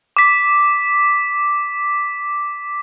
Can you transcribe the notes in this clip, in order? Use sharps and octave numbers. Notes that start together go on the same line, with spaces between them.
D6 B6